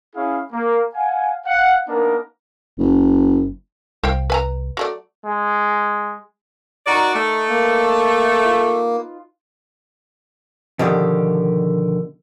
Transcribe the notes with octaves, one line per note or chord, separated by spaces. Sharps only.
C#4 E4 G#4 F5
A#3
F5 F#5 G#5
F5 F#5
A#3 B3 D4 D#4 A#4
F#1
C2 C5 F5 G5
B4 G#5 A#5
F#3 A3 D5
G#3
D#4 F#4 A#4 D5
A3
A#3
B4
F4
B2 D3 D#3 F3 G4